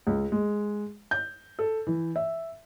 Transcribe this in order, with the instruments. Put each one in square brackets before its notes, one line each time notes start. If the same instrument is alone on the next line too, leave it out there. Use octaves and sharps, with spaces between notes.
[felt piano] C#2
G#3
G6
A4
E3
E5